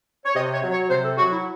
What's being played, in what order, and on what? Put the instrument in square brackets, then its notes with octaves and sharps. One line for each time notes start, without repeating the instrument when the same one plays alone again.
[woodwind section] C#5
C3 D#5
C#5
F#3
C#5
C3 C5
A4
F#3 F#4
E4